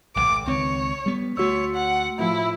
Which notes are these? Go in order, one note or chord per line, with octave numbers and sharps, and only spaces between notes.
D#1 G#1 D6
C#2 D#3 C4 C#5
G3 B3
D2 A3 F#4 C#5 E6
F#5
A2 F3 E4